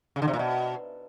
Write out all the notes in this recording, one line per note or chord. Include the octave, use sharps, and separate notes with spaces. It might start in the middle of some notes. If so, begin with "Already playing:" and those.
C#3
D3
C3
A#2
B2